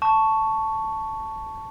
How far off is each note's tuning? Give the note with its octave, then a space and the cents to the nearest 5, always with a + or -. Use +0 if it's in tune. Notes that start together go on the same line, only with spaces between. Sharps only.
A5 +0 C#6 +5